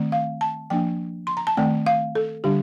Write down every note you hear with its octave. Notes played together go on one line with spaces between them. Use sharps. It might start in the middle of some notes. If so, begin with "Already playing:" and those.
Already playing: D#3 A3 C4
F5
A5
F3 A#3 D4 G5
C6
A#5
A5
D#3 A3 C4 G5
F5
A4
D3 G3 D4 G4